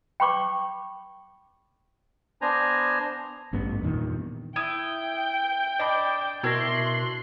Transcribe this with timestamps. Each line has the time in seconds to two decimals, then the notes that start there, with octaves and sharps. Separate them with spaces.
0.20 G5 B5 C#6 D6
2.42 B3 D4 C5 G#5 A#5
3.53 A1 G2 B3
3.83 E2 G2 A#2 D#3
4.56 E4 G5 D#6
5.79 D4 D5 D#5 B5
6.43 B2 D4 E4 A#4 C#5 C6 F#6 A#6